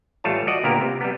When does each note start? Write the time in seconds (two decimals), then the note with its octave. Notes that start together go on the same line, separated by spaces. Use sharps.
0.24 A1 G3 A3 F4 C#5 A5
0.47 F#4 D5 D#5 F#5
0.63 A#2 D3 A#3 B3 G4 A#4
0.81 C3
1.01 G3 B3